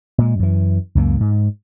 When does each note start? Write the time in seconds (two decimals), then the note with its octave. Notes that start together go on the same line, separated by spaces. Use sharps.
0.18 A#2 G#3
0.39 F#2 E3
0.95 C#2 F#2 A3 A#3
1.20 G#2